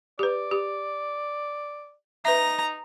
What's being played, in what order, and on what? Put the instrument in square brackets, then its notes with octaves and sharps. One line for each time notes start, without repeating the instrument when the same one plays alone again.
[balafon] G4 B4 [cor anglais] D5
[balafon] G4
[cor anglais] D#4 [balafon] B4 E5 [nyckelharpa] A#5